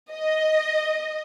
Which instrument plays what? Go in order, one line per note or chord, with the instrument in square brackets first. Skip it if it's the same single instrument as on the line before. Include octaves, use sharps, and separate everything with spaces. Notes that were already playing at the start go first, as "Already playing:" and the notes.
[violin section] D#5